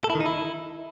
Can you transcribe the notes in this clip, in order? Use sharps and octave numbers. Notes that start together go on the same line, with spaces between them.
A4
E4
D#3
D#4
E4